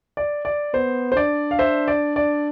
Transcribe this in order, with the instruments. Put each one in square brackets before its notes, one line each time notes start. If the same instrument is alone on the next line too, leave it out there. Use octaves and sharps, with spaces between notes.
[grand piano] D5
D5
[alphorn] B3 [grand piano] C5
[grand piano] C5
[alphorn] D4 [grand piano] D5
[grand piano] F5
C5 E5
D5
D5